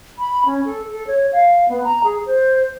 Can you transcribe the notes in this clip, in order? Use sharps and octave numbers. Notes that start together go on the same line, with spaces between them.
B5
C#4
A4
A4
C#5
F5
B3
A#5
G#4
C5